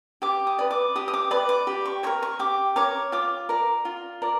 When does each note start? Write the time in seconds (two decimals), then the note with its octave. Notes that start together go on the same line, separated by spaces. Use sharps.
0.22 G4 D6
0.47 D#6
0.59 B4 D5
0.71 D6
0.95 G4 D#6
1.08 D#6
1.13 D6
1.31 B4 D5 D6
1.49 D6
1.67 G4
1.85 C#6
2.03 A#4 C#5 C#6
2.22 C#6
2.39 G4 D6
2.76 A#4 C#5 D6
3.12 F4 D6
3.49 A#4 D5
3.85 F4
4.22 A#4 D5